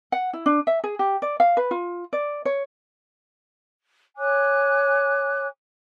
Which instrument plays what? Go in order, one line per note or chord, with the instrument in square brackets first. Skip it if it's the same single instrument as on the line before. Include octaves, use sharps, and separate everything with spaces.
[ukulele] F#5
E4
D4
E5
G#4
G4
D5
F5
B4
F4
D5
C#5
[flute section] C#5 G#5 D6 F#6